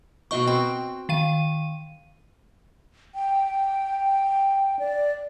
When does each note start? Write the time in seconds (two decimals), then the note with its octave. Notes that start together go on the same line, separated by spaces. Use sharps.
0.31 B2 F#4 D#5 G5 C#6
0.48 C4 G5
1.09 D#3 F5 D#7
3.14 G5
4.79 D5